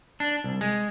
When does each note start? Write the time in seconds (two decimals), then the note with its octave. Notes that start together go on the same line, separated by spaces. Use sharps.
0.20 D4
0.44 C2
0.61 G#3